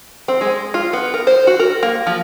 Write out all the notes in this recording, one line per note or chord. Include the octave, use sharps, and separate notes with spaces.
C4
G#3
F4
B3
A#4
C5
F#4
A#4
A#3
F3